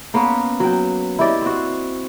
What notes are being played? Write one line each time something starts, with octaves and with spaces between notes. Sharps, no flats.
A#3 B3 C#4 B4
F#3 G5
E4 G4 D5 D#5
C4 F#4